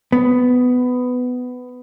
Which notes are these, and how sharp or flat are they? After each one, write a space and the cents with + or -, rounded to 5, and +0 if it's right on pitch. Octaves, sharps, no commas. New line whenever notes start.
B3 +15